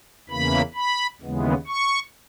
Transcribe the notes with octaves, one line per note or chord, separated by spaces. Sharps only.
E2 C#3 E3 A#3 B5
B5
D#2 C#3 E3 G#3 B3
C#6